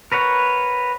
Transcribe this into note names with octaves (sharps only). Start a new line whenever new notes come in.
A#4 B4 C#5 F#5